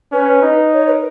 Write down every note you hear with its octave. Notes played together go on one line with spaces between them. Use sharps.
C#4 B4
D#4
C#5
B4
A#4